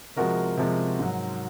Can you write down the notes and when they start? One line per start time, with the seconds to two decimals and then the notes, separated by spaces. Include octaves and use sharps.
0.16 C3 F3 G#3 F#4 A#4
0.57 C3 F3 G#3
0.99 G#2 F#3